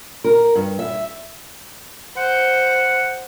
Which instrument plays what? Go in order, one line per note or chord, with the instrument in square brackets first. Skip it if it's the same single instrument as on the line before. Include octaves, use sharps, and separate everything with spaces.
[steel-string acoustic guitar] A#4
G2
E5
[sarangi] C5 [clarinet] F#5